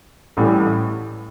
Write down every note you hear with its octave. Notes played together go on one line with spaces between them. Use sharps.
A1 A2 E3 G3